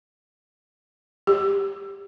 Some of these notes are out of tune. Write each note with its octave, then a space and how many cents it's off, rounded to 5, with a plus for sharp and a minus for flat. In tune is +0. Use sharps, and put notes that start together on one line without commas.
G4 +10